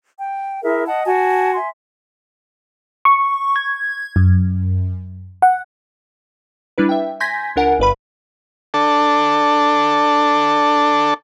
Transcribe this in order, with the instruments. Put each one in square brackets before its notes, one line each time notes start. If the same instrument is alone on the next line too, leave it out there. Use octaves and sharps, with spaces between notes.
[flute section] G5
E4 G#4 A#4 E5
D#5 F#5 A5
F#4 G#5 A5
E5 G#5 C6
[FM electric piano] C#6
G#6
F#2
F#5
[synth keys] G3 D4 E4 B4
E5 G5
G#5 C6 G6 G#6 A#6 B6
C#2 D4 A#4 F#5 G#5 D7
G1 G2 B4 B5
[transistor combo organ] D4 A4